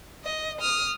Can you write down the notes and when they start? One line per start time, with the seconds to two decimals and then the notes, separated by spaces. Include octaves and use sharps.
0.25 D#5
0.61 D#6 F6